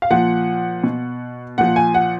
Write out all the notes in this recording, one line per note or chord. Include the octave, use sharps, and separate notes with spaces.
F5
A#2 F3 F#5
B2
A#2 F3 F#5
G#5
F#5